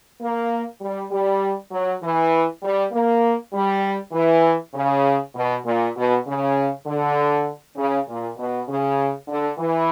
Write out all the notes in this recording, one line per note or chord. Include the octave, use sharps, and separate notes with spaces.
A#3
G3
G3
F#3
E3
G3
A#3
G3
E3
C#3
B2
A#2
B2
C#3
D3
C#3
A#2
B2
C#3
D3
E3